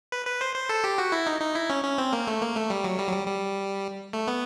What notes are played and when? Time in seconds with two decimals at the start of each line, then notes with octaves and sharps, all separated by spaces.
0.12 B4
0.26 B4
0.41 C5
0.55 C5
0.69 A4
0.84 G4
0.98 F#4
1.12 E4
1.27 D#4
1.41 D#4
1.55 E4
1.70 C#4
1.84 C#4
1.98 C4
2.13 A#3
2.27 A3
2.42 A#3
2.56 A3
2.70 G3
2.84 F#3
2.99 G3
3.08 F#3
3.13 G3
3.27 G3
4.13 A3
4.27 B3